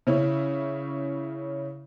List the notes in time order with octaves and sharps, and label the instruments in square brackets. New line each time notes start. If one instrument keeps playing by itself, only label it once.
[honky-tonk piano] C#3 C#4 E4